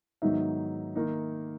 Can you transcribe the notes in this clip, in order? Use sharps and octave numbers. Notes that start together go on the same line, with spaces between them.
G#2 D#3 F#3 B3 D#4 E5
D#3 A#3 D#4